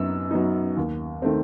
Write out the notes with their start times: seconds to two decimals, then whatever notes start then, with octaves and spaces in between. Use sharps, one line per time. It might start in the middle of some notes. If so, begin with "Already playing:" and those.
Already playing: F#2 F#3 B3 D#4 E6
0.31 F#3 B3 D#4
0.77 D#2
1.22 D#3 A3 C4